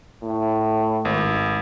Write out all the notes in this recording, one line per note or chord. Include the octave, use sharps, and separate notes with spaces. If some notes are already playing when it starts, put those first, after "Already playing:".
A2
G#1